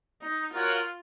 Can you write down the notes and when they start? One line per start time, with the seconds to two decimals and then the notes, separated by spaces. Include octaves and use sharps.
0.22 D#4
0.53 F4 F#4 A#4 C#5 F#5